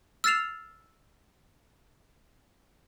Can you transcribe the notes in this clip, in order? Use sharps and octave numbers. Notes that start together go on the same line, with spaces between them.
E6 F6 A6 C7 E7 F7